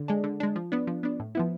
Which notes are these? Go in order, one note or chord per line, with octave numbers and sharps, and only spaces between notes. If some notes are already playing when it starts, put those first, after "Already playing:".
Already playing: D3
G#3 D4
D3
G#3 D4
F3
B3 D4
F3
B3 D4
A2
F3 B3 E4